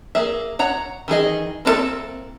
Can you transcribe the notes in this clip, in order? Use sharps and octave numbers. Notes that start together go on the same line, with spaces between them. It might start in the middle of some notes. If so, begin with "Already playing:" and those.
A#3 G#4 E5
C#5 F#5 A#5
D#3 E3 G#4 D#5
A#3 C4 D4 E4 A4